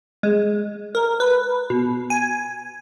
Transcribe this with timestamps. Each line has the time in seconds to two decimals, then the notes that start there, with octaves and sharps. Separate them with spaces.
0.23 G#3
0.95 A#4
1.20 B4
1.70 B2
2.10 G#5